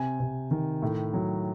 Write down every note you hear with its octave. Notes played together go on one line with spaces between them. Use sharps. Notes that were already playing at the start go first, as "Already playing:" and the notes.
Already playing: C3 G#5
C3
D#3
A2
F#3